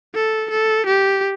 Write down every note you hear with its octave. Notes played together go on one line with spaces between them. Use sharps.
A4
A4
G4